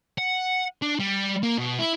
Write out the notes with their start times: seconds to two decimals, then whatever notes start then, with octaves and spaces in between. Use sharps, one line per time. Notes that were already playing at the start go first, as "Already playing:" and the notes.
0.18 F#5
0.82 D4
1.00 G3
1.43 A#3
1.58 B2
1.79 E4